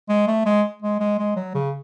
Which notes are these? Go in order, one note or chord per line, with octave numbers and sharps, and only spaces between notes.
G#3
A3
G#3
G#3
G#3
G#3
F#3
C#3